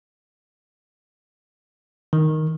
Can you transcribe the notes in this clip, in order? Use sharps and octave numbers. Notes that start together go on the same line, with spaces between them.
D#3